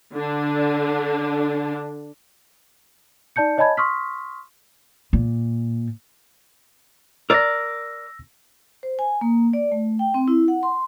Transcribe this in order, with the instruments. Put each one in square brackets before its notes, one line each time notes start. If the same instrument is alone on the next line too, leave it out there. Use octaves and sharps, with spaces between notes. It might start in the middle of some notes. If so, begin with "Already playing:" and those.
[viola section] D3 D4
[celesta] D#4 D5 A5 G6 C#7
C#5 D#5 G#5 A5 B5 G#6
C6 C#6 D#6 F6 B6
[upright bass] A#2
[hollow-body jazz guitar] A#4 D5 [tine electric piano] E6 A#6
[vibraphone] C5
G#5
A#3
D5
A3
G5
C4
E4
F#5
C6